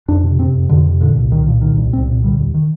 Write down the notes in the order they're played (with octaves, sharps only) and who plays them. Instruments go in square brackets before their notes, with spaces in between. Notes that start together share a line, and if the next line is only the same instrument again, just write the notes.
[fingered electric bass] F2 D4
C3
C3 C4
F2
F2 D3
C3
A#2 D3
C2
C2 D#3
A#2
A#2 D#3
C2
C2 C4
A#2
D3 G3
D#2
D#3